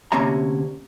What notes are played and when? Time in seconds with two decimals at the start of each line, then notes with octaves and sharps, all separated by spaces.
0.12 D2 C3 A#3 C#4 E5 A#5